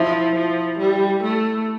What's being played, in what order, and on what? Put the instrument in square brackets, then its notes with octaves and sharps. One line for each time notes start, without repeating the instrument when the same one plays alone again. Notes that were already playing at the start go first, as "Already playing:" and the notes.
Already playing: [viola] F3 [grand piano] E4
[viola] F3
G3
A3